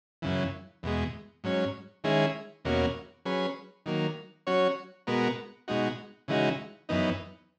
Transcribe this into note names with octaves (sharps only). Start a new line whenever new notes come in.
F#2 C#3 E3
E2 B2 G#3
G#2 F#3 C#4
D#3 G#3 C#4 E4 G#4
E2 B2 A#3 C#4 F#4
F#3 C#4 G#4 B4
D#3 F#3 A#3
F#3 C#4 F#4 C#5
B2 G#3 B3 F#4 A#4
B2 G#3 D#4 F#4
C#3 E3 G#3 D#4 F#4
F#2 E3 B3 D#4